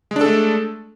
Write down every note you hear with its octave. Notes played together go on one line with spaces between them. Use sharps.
G#3 A3 D4 A4